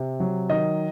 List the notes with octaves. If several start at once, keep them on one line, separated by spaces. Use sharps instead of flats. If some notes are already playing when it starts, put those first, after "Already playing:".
Already playing: C3
F#3
D#3 D#5